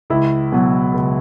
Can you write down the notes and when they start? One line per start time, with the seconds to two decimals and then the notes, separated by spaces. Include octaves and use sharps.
0.10 C#2 E4
0.52 B2 F#3
0.94 C#2